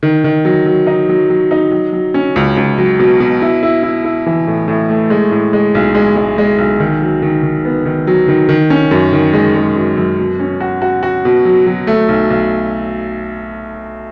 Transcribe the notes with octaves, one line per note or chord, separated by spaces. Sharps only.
D#3
D#3
F#3
F#3
D#4
F#3
F#3
D#4
F#3
F#3
C#4
C#2
C#2
F#3
B2
B2
E4
E4
E4
E4
E3
A2
A2
A3
G#3
A2
G#3
B1
G#3
G#3
G#3
B1
D#3
F#3
D#3
D#3
B3
D#3
F#3
D#3
D#3
C#4
F#2
D#3
G#3
G#3
F#2
F#2
B2
C#4
F#4
F#4
F#4
B2
F#3
F#3
A3
B1
B1